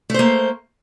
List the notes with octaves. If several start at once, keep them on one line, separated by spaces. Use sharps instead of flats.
A3 A#3 C5